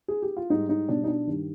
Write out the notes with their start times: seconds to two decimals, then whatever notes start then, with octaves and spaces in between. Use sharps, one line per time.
0.08 G#4
0.22 G4
0.37 F4
0.50 G#2 G3 D#4
0.69 D#4
0.89 B2 G3 D4
1.04 D#4
1.08 D4
1.27 G2 D#3 G3